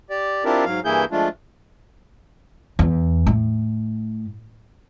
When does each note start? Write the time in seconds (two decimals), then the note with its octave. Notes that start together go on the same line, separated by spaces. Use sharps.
0.10 G4 D5
0.45 C4 D4 E4 F4 G4 A#4
0.65 G#2 F#3 F5
0.85 G2 E3 A#3 E4 G#4 G6
1.12 F3 G#3 A3 D4 F4
2.79 E2
3.27 A2